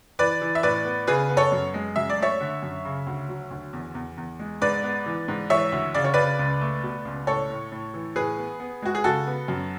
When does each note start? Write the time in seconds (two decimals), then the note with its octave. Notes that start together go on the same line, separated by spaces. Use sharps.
0.19 E3 B4 D5
0.41 E3
0.55 E5
0.63 A2 B4 D5
0.85 B3
1.07 C#3 G#4 B4
1.30 B3
1.37 A4 C#5
1.52 F#2
1.74 G#3
1.96 F#2 E5
2.10 D5
2.18 A3 C#5 E5
2.40 D3
2.63 F#2
2.85 C#3
3.07 D2
3.29 F#3
3.51 D2
3.73 E2
3.95 E2
4.17 E2
4.39 G#3
4.62 G#2 B4 D5
4.83 B3
5.06 E3
5.28 G#2
5.50 E3 C#5 E5
5.72 D2
5.94 C#3 D5
6.05 C#5
6.14 C#3 B4 D5
6.39 C#2
6.61 A3
6.83 B2
7.05 C#2
7.27 A2 A4 C#5
7.50 A2
7.72 A2
7.94 E3
8.16 A2 G#4 B4
8.38 B3
8.60 B3
8.82 G#3 F#4
8.95 G#4
9.04 C#3 F#4 A4
9.27 B3
9.48 F#2